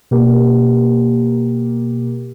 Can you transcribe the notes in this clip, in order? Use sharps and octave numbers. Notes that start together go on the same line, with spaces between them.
B2 A#3 G4 A#4